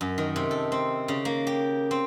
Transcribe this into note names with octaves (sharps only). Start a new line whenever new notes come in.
F#2
D#3
C3
A4
C4
C#3
A#3
G4
C4